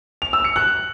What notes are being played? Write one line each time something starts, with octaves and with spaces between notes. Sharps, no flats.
F7
E6
C#7
F#6